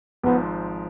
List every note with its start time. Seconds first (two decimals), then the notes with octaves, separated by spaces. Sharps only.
0.24 G#1 G#2 F3 B3